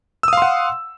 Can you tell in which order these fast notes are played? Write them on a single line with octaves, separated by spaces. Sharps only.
E6 D#6 F5 C6 F#5